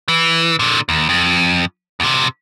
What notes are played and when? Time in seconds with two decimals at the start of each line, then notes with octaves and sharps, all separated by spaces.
0.08 E3
0.59 A#2 D3
0.89 D#2
1.09 F2
2.00 E2 C3